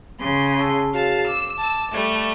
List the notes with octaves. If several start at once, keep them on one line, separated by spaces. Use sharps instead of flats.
C#3 C6
G#4 A5 E6
F#4 G#4 C#5 F5 A5
D6 E6
A5 E6
G3 A3